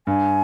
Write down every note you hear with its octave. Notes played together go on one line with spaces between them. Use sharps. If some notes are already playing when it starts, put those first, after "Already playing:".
G2 G#5